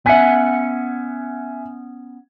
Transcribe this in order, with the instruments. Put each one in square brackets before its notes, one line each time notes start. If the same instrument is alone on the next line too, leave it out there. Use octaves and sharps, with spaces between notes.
[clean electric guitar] B3 C#4 F#5 [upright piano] E5 G#5